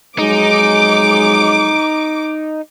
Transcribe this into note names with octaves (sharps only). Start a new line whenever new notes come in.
F2 F#3 G#3 D#4 D6